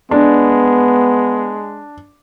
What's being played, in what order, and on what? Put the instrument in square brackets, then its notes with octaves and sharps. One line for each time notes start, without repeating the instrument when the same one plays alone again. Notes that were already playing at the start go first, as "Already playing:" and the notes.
[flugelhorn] G#3 [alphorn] B3 [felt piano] D4